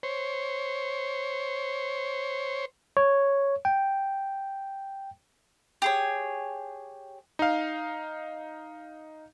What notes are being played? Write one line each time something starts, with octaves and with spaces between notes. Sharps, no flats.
C5 C#5
C#5
G5
G4 G#4 C#5
D#4 F5